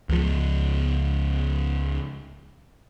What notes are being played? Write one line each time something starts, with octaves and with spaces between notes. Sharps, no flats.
C#2 F3